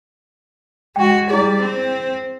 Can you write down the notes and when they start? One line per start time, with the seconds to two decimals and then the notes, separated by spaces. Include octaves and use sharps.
0.96 G#3 F#4 G5
1.30 G3 E4 G#4 D5
1.61 C4